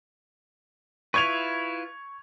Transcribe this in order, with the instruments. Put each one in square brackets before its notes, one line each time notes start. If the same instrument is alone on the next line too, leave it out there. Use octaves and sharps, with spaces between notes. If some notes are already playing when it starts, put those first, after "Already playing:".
[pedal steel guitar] E4 F4 B4 [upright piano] C#6 G#6 F7